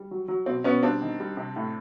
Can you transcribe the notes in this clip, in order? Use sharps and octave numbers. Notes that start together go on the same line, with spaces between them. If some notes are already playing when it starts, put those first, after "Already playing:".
Already playing: G3
F#3
F#3
B2 C4
B2 B3 C#4
G3 C4 D4
D#3
G3
C3
A2